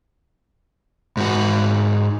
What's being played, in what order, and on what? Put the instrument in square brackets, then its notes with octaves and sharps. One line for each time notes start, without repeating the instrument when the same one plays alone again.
[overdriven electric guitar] G#2 F#4